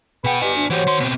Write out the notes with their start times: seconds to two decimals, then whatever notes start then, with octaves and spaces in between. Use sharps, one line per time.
0.24 B2 G#4 B4 F#5 G5
0.42 B3 D#4 G4 D5 G#5
0.55 D2 D4
0.70 E3 F#4 G4 C5 C#5
0.87 D#3 C6
1.00 B2 C4